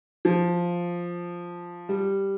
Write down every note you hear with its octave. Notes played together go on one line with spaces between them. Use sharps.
F3
G3